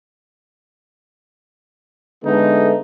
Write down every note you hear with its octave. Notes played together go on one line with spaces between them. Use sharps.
D3 G#3 A3 B3 D#4